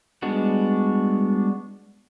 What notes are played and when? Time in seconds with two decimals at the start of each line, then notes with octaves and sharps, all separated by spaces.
0.22 G3 G#3 B3 D4 F#4